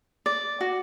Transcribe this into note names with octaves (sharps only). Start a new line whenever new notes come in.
D5
F#4